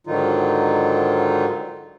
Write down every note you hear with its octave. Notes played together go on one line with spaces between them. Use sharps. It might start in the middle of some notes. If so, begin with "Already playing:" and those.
G#2 D3 D#3 F#3 D#4 F4